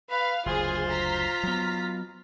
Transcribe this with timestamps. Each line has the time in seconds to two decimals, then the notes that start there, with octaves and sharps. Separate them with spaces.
0.11 B4 F5
0.46 F#1 D2 F4 G#4 C5 C6
0.89 A#5 B6
1.43 F#3 B3